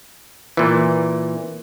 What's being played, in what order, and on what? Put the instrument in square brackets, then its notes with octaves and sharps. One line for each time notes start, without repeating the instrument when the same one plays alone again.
[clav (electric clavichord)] A#2 E3